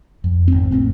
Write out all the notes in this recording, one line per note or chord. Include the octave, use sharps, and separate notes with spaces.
F2
G#1 C4
F1 A2 A#3 C4